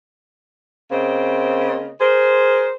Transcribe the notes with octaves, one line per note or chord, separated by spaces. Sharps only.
C#3 A#3 C4 C5 D#5
G#4 A#4 C5